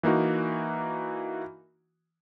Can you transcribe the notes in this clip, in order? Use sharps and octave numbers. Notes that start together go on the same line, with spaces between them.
E3 A#3 D#4 F#4